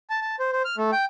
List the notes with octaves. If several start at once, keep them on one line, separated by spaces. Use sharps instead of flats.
A5
A5
C5
C5
F6
A3
G5